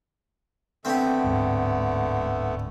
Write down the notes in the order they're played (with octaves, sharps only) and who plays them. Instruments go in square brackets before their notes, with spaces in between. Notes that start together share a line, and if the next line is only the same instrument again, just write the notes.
[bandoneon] D3 A3 B3 [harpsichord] C4 G4
[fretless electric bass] D1 G#2